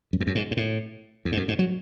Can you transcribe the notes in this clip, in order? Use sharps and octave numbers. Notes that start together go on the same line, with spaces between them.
F#2
E2
F#2
G#2
G#2
A2
E2
G#2
F#2
G#2
F#3